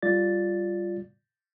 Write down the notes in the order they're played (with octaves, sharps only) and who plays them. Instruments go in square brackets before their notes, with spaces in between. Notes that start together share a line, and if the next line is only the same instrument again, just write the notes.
[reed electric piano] G3 F4 D5 A6